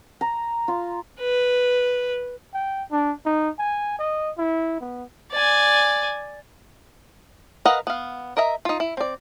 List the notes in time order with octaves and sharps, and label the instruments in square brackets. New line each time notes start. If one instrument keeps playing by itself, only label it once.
[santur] A#5
F4
[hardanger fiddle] B4
[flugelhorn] G5
D4
D#4
G#5
D#5
E4
B3
[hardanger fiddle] D5 G#5
[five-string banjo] A#4 B4 D#5 F5 F#5
B3 F5
A#4 D#5 E5 A#5
D#4 F4
E4
C4 D5